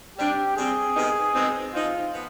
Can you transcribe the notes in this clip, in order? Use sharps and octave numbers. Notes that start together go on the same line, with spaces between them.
C3 G3 D4 G4
C3 G3 C4 G#4
C3 D#3 B3 D#4
B2 G#3 C4 D#4
F3 C4 D#4 F4
F3 B3